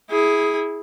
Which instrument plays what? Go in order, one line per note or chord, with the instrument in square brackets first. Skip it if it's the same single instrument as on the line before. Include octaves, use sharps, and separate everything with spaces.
[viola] E4 G#4